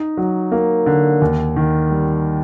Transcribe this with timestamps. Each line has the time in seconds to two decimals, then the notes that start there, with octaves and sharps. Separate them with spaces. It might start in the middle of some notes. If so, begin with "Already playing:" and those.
Already playing: D#4
0.17 F#3
0.52 A#3
0.86 D3
1.21 D#2
1.56 D#3
1.90 G3